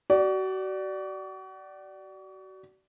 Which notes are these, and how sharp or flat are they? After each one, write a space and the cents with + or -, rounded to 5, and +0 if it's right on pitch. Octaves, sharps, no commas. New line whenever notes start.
F#4 +35 D5 +0